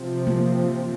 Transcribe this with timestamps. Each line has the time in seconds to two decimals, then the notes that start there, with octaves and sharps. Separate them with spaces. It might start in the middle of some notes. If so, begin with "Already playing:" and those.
Already playing: C3 F3 C4
0.27 A#3